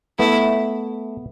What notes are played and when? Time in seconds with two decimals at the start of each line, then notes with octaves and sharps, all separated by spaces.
0.19 A3 B3 E4